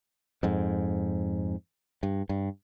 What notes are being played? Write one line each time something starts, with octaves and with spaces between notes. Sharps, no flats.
F2 G#2
G2
G2